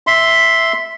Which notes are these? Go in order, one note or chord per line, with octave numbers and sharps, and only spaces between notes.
E5 C6